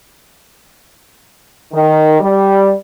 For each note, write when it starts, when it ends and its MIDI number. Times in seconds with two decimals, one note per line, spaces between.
1.73 2.16 51
2.20 2.73 55